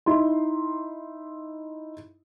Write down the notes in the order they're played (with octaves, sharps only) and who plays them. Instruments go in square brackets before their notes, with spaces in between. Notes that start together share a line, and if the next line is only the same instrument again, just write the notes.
[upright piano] D#4 E4 C6